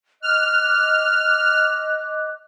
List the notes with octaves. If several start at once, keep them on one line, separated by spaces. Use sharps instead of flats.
D#5 D6 F6 F#6